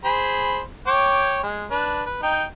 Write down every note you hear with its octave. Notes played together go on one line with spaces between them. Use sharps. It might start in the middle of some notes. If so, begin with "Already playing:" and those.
G#4 C5 B5
C#5 G5 D6
G#3
D4 B4
B4
D#4 G5